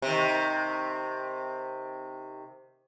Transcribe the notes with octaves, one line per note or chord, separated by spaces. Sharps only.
C3 D#3